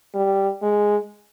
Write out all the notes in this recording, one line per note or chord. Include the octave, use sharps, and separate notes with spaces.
G3
G#3